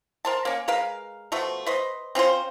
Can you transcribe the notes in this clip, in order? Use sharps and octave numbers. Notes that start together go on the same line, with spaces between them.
A#4 C5 A5
A#3 C#4
G#3 A#4 B4 F5
B2 F3 A3
B4 C5 D#5
C4 C#4 F4 C5